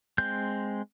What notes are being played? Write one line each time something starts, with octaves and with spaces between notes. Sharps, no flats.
G#3 C4 G6